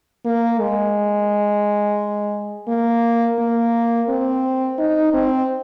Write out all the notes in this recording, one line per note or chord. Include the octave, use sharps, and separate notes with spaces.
A#3
G#3
A#3
A#3
C4
D#4
C4